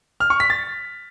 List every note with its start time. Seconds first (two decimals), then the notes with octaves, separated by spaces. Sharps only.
0.20 F6
0.30 C#6
0.40 B6
0.50 A6